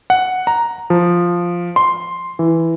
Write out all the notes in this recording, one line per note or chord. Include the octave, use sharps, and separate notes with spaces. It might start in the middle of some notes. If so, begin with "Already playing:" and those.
F#5
A#5
F3
C6
E3